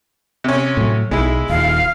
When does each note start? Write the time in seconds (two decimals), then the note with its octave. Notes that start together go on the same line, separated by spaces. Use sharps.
0.44 C3 C#4
0.77 A2 F#3
1.11 B1 G#3 E4
1.49 D#1 F5